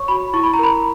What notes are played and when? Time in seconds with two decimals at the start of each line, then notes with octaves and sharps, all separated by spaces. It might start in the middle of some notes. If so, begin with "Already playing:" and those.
Already playing: C#5 C#6
0.08 F#4 B5
0.34 E4 C#6
0.43 B5
0.54 A#5
0.59 A#4 B5